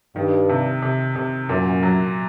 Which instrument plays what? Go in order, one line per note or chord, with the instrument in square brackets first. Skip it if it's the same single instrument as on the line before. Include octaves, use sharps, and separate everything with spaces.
[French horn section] G2 [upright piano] D#3
[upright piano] C3
C3
C3
[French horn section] F#2 [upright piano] A#2
[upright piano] F#3